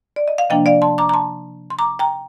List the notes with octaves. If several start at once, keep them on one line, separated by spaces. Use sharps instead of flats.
D5
D#5
F5
C3 F3 A#3 D4 D#5 G5
D5 F5
A5 C6
A#5 D6
A#5
A5 C6
C6
A#5 D6
G5 A#5